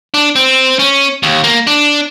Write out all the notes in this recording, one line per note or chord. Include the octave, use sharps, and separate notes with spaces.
D4
C4
C#4
D#2
A#3
D4